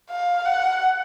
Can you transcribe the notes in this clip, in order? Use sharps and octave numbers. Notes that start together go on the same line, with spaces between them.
F5
F#5